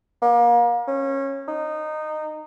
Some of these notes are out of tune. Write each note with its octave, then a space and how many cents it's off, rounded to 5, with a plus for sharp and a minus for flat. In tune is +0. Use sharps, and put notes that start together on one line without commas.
A#3 +35
C#4 -25
D#4 -15